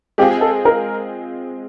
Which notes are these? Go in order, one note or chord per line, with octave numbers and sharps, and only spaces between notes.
G#3 C4 F4 G4 G#4
A4
A#4